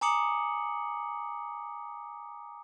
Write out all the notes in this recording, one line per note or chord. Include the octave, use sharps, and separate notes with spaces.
G#5 A#5 D6 D#6 C#7 F#7